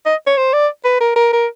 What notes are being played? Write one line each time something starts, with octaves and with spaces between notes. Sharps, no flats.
D#5
C#5
C5
D5
B4
A#4
A#4
A#4